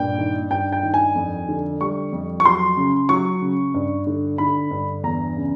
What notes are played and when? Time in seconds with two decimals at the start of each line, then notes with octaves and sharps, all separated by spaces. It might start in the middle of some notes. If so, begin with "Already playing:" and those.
Already playing: G2 A#2 G5
0.19 D#3
0.51 G2 G5
0.72 G5
0.83 D#3
0.94 G#5
1.15 F2
1.49 D3
1.81 G3 C#6
2.12 F2
2.40 C#6
2.45 F#3 C6
2.77 C#3
3.09 F#3 C#6
3.42 C#3
3.74 G2
4.07 D3
4.38 D3 B5
4.71 G2
5.03 E2 A#5
5.37 C#3